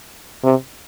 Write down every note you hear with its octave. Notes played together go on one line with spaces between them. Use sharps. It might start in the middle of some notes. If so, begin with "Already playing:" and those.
C3